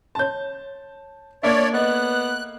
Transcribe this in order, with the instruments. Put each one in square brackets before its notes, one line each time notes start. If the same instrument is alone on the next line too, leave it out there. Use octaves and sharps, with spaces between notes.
[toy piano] C#5 C6 [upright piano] A5 G6
[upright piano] A#3 E5 [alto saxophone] D4 [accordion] C#5 D5
[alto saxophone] B3 [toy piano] A4 B4 D#5 [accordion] F#6